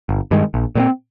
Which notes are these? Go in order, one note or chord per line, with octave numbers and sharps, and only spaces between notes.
G1
G2 D#3 G#3
A#1
A#2 G3 C4